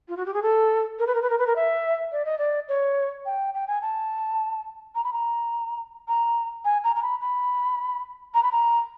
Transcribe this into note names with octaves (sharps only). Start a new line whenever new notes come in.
F4
F#4
G4
G#4
A4
A#4
B4
A#4
B4
A#4
B4
A#4
E5
D5
D#5
D5
C#5
G5
G5
G#5
A5
A#5
B5
A#5
A#5
G#5
A#5
A#5
B5
B5
A#5
B5
A#5